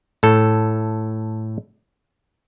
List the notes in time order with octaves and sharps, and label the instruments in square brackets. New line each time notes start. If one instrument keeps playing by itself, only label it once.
[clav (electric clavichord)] A2 A4